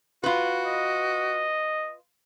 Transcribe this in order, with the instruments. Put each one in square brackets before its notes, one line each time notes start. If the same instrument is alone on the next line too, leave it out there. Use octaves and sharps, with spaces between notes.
[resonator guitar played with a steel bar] F4 B4 [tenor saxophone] F#4
[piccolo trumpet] D#5